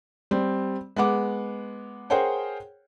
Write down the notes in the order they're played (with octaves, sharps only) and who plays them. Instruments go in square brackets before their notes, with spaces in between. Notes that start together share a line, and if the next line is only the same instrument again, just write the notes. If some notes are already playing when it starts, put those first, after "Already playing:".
[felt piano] G3 C4
G#3 B3 F#5 D6
G#4 A#4 C5 C#5 F#5 G5